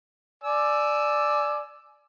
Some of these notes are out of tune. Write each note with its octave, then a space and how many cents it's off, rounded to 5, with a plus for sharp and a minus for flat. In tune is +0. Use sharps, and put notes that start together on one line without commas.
D5 +5 G#5 +30 E6 +5